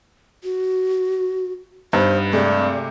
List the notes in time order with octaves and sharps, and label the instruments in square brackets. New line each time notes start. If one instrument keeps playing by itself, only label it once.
[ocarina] F#4
[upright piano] G2 [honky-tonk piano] B3 D#4 [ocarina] C5
[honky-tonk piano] C3 G#3 A3 [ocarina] D5